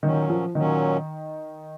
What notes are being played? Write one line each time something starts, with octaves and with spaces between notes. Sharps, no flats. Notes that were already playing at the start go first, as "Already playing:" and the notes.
A#2 D#3 F#3 C#4
F3
A#2 D#3 F#3 C#4